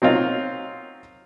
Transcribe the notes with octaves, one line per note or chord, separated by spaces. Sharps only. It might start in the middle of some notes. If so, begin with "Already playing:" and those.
F#3 C4 D#4 F4